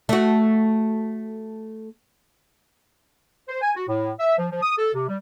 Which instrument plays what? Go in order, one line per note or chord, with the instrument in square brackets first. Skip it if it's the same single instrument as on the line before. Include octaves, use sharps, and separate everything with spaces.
[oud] A3 F#4
[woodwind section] C5
G#5
F#4
A2
E5
F3
F3
D#6
A4
C3
G3